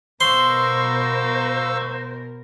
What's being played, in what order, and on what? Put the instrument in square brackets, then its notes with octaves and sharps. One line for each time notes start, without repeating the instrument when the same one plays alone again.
[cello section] B2 A#4 [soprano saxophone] C5 [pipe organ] F5 C#6 E6 [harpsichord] C6